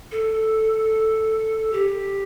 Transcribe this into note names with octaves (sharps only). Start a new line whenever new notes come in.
A4
G4